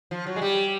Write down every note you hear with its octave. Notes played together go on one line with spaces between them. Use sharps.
F3
F#3
G#3
G3